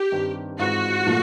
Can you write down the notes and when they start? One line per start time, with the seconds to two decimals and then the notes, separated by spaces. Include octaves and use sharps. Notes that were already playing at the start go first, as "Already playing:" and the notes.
Already playing: G4
0.12 G2 D#3 G3 C4
0.59 G#2 E3 G#3 C4 F4 F#4
1.06 A#2 F3 A3